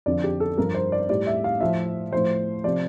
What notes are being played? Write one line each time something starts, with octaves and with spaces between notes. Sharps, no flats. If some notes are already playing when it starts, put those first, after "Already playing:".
F2 D3 F3 D5
G4
A4
G2 F3 A#4
C5
D5
A2 G3 D5
E5
F5
A2 F3 E5
A2 F3 C5
C3 F3 D5